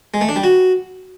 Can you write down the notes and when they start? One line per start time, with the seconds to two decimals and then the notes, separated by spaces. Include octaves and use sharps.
0.14 G#3
0.21 A3
0.29 D4
0.36 G3
0.44 F#4